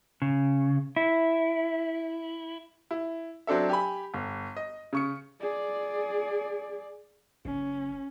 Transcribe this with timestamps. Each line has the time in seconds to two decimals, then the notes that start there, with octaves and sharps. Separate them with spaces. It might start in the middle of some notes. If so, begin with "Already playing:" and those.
0.22 C#3
0.96 E4
2.91 E4
3.47 F#3 C4 D4 A4 E5
3.69 G4 G#5 B5
4.14 G1
4.57 D#5
4.93 C#3 C#6 C#7
5.40 G#4 D5
7.45 F#1 C#4